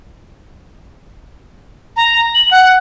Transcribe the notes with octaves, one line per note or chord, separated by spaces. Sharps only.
A#5
F#7
F#5